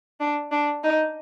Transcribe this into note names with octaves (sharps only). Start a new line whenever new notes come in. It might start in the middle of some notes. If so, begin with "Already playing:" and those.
D4
D4
D#4